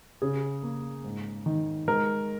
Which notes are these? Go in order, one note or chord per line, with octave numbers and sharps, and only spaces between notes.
C#3 G#4
A#3
G#2
D#3
G#3 A#4